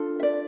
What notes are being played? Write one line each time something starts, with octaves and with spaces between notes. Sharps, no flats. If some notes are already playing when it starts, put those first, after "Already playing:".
Already playing: D4 F4 A4
E5
D5